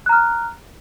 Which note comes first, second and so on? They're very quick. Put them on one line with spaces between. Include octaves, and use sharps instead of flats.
F#6 A#5 F6